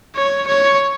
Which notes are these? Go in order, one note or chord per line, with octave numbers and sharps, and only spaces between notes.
C#5
C#5